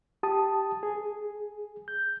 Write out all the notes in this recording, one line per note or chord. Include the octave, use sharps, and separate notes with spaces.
G4 A5 D#6
G#4
G6